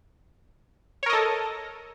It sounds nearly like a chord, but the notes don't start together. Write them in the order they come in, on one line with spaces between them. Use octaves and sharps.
C#5 A#4 D#5 A4